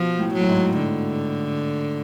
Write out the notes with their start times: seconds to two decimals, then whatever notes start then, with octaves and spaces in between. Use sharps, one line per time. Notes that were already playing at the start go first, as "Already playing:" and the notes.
Already playing: B2 F3
0.19 A2
0.34 F#3
0.41 A2
0.49 G#2
0.78 D3